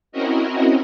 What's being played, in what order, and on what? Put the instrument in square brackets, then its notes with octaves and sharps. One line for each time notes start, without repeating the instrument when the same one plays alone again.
[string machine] C4 C#4 E4 F#4 A#4 D#5